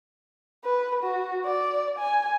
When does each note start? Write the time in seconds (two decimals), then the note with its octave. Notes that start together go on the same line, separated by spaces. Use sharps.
0.64 B4
1.03 F#4
1.45 D5
1.99 G#5